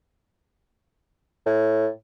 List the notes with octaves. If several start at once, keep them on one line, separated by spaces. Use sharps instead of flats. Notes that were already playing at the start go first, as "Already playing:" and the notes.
A2